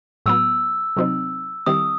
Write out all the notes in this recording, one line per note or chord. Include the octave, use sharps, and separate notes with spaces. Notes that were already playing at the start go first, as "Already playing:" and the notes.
A2 F#3 B3 E6
C3 F#3 C4 D#4
D#3 G3 C4 E4 G4 D#6